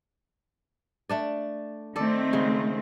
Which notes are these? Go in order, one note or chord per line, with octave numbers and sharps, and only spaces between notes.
A3 D4 D5
D#3 A3 C4 A4 D5
C#3 G#3